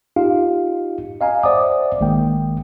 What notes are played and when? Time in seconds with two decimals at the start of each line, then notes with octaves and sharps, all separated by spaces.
0.16 D#4 F4 G4 F5
1.21 D#5 F5 G#5 A#5
1.43 C5 D5 E5 F#5 D6 D#6
2.00 A1 D#3 G#3 A#3 G5